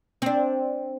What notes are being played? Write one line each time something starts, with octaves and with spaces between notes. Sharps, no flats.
C4 D4